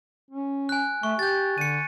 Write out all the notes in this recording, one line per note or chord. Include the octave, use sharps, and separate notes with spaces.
C#4
G#5 F#6
A3 C#6
G4 G6 A6
D3 C#7 D#7